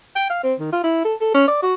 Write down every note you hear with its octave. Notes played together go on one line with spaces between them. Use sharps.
G5
F5
C4
D#3
F4
E4
A4
A4
C#4
D5
F#4